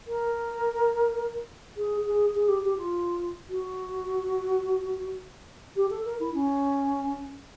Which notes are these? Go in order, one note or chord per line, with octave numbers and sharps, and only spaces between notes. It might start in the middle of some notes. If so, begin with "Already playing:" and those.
A#4
G#4
G#4
G#4
G4
G4
F4
F#4
G4
A4
A#4
E4
C#4